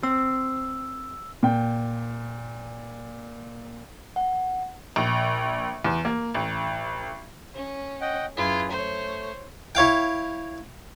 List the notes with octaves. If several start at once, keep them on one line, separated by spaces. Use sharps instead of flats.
C4 E6
A#2 G5
F#5
A#1
E2
A#3
A1
C#4
D#5 F#5 G5
F#2 E4 F4 G#4 B4
A3 C5 C#5
E4 C#5 F5 G5